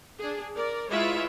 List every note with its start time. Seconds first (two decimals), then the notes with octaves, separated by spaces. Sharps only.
0.19 D4 G#4
0.54 A#4 D5
0.90 G#3 E4 F4 B4 C#5 E5